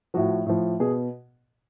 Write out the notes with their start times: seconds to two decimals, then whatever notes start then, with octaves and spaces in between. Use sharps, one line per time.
0.14 A2 F3 F#4
0.46 A2 F3
0.80 B2 G#4